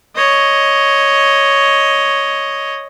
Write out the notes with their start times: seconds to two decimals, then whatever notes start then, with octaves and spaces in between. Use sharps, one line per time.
0.16 C#5 D#5